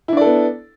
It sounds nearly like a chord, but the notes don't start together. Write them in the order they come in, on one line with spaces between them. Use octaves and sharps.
E4 D4 D5 A4 B3